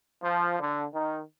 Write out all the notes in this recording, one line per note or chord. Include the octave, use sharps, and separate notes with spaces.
F3
D3
D#3